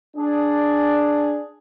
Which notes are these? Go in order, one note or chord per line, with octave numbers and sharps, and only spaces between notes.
D4 G#4